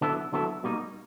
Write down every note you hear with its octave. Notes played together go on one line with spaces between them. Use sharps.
D3 F#3 B3 E4 A4
D3 F#3 B3 E4 A4
B2 G3 A#3 D#4